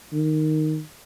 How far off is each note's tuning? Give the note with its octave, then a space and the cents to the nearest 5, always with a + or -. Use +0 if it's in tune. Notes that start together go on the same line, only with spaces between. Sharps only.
D#3 -5